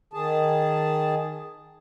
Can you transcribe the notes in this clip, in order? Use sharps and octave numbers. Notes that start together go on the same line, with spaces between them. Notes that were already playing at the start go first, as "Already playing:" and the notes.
D#3 G#4 A5